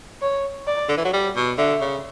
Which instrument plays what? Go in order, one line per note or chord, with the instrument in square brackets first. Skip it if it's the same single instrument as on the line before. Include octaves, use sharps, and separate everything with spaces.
[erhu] C#5
D5
[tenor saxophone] D3
E3
F#3
G3
B2
[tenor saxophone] D3 [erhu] E5
[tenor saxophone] C#3